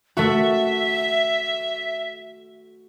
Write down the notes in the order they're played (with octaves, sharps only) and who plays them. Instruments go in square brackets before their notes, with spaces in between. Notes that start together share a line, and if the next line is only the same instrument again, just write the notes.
[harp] A3 F#4 [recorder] E5